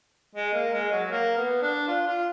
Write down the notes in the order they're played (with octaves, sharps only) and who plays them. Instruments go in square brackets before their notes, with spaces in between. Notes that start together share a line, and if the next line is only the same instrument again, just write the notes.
[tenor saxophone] G#3
A#3
G#3
F#3
A#3
B3
D4
F4
F4